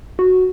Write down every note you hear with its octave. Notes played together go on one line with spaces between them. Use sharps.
F#4